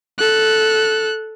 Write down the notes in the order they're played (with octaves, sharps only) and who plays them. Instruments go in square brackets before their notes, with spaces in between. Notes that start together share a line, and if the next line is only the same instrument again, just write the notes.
[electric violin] A4 F#6